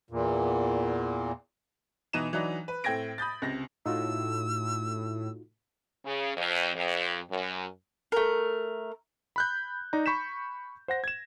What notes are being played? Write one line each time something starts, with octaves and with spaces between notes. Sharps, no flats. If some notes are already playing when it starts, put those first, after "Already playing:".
E2 A#2
B2 E3 D#4 D#7 E7
E3 F#3 D4 D#4
B4
A2 C4 G5 G#6 A#6 D7
B5 D#6 G6 A6
C#2 C3 A#6
A2 D#4 F4 F#4 E6
C#3
F2
F2
F#2
A3 A#4
B5 F#6 G6
D#4 D5 A#5
B5 C#6 G6 B6 E7
C5 F#5 A#6
G#6 E7